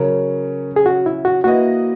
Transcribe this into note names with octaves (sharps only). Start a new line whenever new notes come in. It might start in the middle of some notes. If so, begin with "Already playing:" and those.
Already playing: C#3 F#3 C#4 A#4
G#4
F#4
E4
F#4
A#3 E4 F#4 B4 D#5